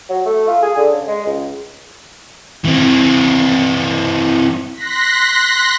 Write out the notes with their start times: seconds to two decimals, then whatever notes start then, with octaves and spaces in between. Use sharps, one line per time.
0.09 F#3
0.25 A3
0.48 F4
0.62 G#4
0.76 D3
0.92 C#3
1.07 G#3
1.26 C#2
2.64 E3 C4
4.72 C6 F#6 A#6 B6